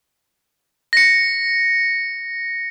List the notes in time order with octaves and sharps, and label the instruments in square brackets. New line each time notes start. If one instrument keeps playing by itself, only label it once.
[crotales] A#6 C#7